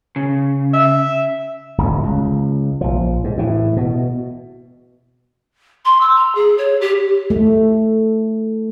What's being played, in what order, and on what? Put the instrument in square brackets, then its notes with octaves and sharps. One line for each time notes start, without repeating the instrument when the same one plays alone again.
[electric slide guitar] C#3
[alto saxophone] E5
[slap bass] D1 G1 D2
C#2
A#1 F3
G#2
A2 E3
B2
[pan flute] C6
E6
A#5
G#4
C#5
G4
[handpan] A3